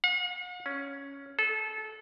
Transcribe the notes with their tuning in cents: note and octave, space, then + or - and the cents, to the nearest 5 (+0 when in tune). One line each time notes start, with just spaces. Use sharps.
F#5 -45
C#4 +5
A4 -25